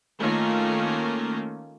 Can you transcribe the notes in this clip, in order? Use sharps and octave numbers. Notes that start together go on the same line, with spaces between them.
D#3 A3 A#3 C#4 F4